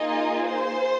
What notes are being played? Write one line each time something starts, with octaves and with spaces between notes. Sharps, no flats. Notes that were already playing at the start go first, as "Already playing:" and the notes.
Already playing: A#3 D#4 F4 G#4 D#5
C5